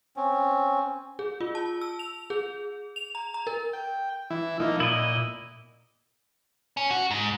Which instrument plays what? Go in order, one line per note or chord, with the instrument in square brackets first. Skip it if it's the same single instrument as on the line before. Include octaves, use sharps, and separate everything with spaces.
[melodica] C4 C#4
[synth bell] G#4
F4
A5
E6
F7
G#4
F7
A#5
A#5
A#4
[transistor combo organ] G5
E3 E4
F3 A#3 D#4
[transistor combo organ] A#2 [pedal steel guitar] E4 D#5
[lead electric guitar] C#4
F#4
G#2